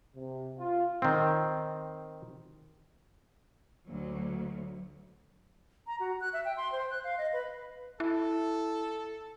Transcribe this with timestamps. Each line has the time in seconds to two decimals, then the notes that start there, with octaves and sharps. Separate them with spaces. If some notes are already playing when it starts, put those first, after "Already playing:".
0.16 C3
0.58 F4
1.02 D#3 C4
3.88 D2 F#3
5.87 A#5
6.00 F#4
6.21 F#6
6.33 E5
6.45 G5
6.57 C6
6.72 C5
6.91 F#6
7.04 F5
7.18 D#5
7.33 B4
8.00 E4 A4